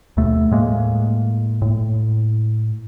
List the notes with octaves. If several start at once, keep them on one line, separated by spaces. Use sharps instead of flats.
D#2 B2 A3
A2 G#3 A#3
A2